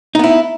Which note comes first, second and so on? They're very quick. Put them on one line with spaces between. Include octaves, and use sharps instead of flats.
D#4 B3 E4